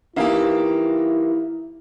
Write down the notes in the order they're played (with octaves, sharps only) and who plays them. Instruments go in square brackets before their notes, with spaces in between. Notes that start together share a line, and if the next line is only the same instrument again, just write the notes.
[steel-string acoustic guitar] E3 A#3 G4 [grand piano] D#4 E5 F5 [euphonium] E4